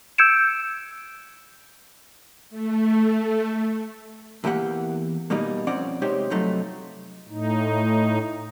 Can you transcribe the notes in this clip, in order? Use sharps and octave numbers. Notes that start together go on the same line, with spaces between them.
E6 G6 G#6 C#7 D7 E7
A3
E2 E3 A#3 G4 F#5
B2 G3 A#3 D#4
F2 C4 C#4 D5 F#5
C3 G#3 D#4 G4 C5 C#5
G2 C3 F3 F#3 A3 D#4
A2 D#4